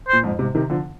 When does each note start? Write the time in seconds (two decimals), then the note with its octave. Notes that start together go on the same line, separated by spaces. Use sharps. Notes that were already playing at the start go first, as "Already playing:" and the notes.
0.08 A#2 C5
0.24 F2 G#2
0.39 G#2 C3
0.55 C3 D#3
0.70 D3 F3